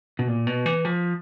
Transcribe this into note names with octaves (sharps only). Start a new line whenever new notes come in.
B2
A#2
B2
E3
F3